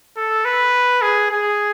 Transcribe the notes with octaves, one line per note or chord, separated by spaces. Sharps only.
A4
B4
G#4
G#4